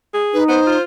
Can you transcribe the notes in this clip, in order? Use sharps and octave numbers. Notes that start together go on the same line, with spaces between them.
G#4
D#4 B4
B3 C5
F4